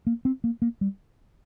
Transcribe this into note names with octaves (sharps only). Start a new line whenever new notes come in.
A#3
C4
A#3
A#3
G3